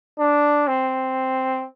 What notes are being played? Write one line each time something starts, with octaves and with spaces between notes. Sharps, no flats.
D4
C4